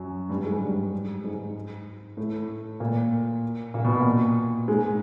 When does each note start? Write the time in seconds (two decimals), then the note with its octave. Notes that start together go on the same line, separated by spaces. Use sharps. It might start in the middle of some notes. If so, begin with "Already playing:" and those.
Already playing: F#2 F#3
0.29 G2 G3
0.45 G#2 G#3
0.61 G2 G3
1.24 G#2 G#3
2.17 A2 A3
2.80 A#2 A#3
3.74 A#2 A#3
3.85 B2 B3
3.94 A#2 A#3
4.68 G#2 G#3